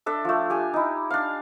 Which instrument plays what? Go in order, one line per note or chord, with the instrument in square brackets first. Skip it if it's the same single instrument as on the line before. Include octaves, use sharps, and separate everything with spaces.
[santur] D4 A4 E5
F3 A3
G4 G#5
D#4 E4
D4 F5